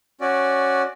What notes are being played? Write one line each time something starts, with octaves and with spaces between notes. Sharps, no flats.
C#4 F#4 D5